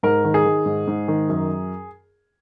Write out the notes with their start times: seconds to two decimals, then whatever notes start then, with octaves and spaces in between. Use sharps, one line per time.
0.03 G#2 A#4
0.25 D#3
0.34 G#4
0.45 D#3
0.66 G#2
0.87 G#2
1.08 D#3
1.29 F#2